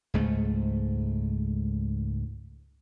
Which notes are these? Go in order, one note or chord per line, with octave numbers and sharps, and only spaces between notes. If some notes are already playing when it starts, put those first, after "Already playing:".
C#2 G#2 A3